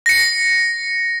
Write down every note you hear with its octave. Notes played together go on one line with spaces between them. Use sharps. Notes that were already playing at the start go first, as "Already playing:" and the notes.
A#6 C#7